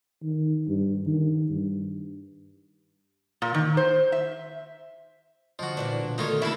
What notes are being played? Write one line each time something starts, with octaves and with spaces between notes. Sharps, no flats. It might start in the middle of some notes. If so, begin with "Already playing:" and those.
D#3
G2
D#3
G2
A#2
D#3
C5
E5
D3 F3 F#3 F#4 D#5
A#2 E3 D4
B2
D3 D#3 A3 D#4 F4 F#4 A#4 C#5
C#3 A#3 E4 A4 E5